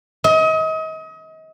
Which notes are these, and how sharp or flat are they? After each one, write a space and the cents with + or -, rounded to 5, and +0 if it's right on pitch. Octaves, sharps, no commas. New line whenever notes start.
D#5 +35